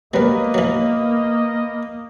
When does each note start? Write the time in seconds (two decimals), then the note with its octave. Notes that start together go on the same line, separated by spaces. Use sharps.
0.14 F#3 G3 A#3 B3 A#4 B4 D#5
0.54 E3 F#3